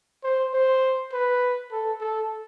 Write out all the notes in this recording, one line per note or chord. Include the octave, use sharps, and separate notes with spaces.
C5
C5
B4
A4
A4